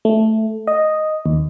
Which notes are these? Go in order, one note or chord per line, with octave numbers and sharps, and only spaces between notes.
A3
D#5
D#2